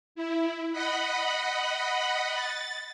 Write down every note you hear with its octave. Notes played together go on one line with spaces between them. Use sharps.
E4
D#5 F#5 B5
A6